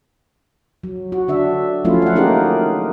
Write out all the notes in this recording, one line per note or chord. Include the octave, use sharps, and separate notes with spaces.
F#3
F#4
D3 D4 E5
F3 F#3 A3 C#4 E4 F4
F5 F#5
A#3 C#4 D#4 G4 G#4 A#4